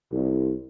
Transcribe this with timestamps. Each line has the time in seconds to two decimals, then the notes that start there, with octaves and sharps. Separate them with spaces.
0.12 C2